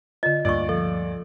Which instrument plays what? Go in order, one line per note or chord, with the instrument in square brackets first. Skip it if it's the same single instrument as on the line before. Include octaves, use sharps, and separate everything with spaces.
[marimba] D3 F4 [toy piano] D#5
[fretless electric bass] D2 G2 [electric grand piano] A#2 D5 [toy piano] D#5 C#6
[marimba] F3 [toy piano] A4